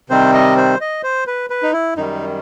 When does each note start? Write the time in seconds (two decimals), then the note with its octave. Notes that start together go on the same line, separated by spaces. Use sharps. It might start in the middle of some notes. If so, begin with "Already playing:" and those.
0.10 C3 D#3 G3 C4 C5
0.33 D#5
0.57 C5
0.81 D#5
1.03 C5
1.27 B4
1.50 B4
1.63 D#4
1.73 E4
1.96 F#2 D#3 G3 D#4